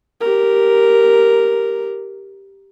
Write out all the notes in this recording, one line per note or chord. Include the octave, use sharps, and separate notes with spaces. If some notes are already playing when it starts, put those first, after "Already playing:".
G4 A#4